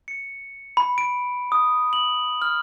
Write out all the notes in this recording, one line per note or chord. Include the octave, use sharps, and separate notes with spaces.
C#7
B5
D7
D#6
F#7
F6